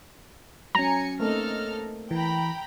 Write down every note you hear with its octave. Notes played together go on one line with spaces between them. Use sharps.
F#3 C#4 G#5 A#5 A#6 C#7
A3 A#3 C4 D#4 A4 F6
E3 G5 A#5 B5